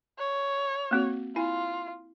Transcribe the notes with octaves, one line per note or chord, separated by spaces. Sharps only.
C#5
A#3 C4 F#4
E4 F4 G#5